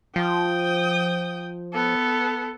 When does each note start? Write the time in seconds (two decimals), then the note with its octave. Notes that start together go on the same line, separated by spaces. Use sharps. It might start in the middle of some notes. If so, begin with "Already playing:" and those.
0.16 F3 G5 D#6
1.73 B3 A4